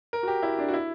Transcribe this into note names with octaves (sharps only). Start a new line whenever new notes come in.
A#4
F#4
G4
E4
D4
F#4
E4